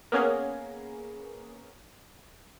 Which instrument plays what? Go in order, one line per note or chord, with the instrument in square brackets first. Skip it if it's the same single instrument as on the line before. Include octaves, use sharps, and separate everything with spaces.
[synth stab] A#3 B3 C#4 G#4 A#4